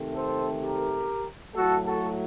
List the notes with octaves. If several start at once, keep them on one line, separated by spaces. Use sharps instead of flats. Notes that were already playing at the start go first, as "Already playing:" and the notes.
Already playing: C3 D#3 A3 C4
A4 C5
G4 A#4
A2 F#3 A3 F#4 A4
F#4 A4